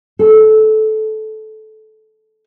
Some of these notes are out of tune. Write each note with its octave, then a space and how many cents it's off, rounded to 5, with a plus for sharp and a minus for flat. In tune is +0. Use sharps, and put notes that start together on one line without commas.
A4 -20